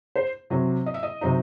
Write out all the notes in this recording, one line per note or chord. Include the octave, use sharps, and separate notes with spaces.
C5
C3 F#3 C4
D#5
E5
D#5
C3 F#3 C4 D#4